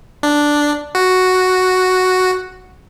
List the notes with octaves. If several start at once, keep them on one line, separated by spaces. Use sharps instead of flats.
D4
F#4